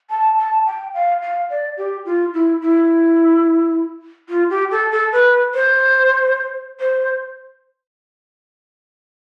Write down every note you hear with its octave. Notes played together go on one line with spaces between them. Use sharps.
A5
A5
G5
F5
F5
D5
G4
F4
E4
E4
F4
G4
A4
A4
B4
C5
C5